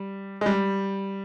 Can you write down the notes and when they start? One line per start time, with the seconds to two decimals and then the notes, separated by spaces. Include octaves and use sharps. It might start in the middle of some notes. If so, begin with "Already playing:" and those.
Already playing: G3
0.41 G#3
0.46 G3